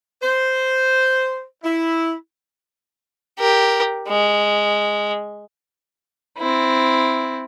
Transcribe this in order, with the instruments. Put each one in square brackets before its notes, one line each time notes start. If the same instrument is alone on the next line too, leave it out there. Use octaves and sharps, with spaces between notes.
[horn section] C5
E4
[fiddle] G4 A#4
G#3
[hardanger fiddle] C4 E4